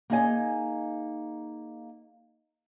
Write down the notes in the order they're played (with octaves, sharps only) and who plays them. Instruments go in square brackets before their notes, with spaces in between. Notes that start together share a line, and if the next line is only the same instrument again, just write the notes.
[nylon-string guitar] A#3 D#4 G#4 D#5 E5 G#5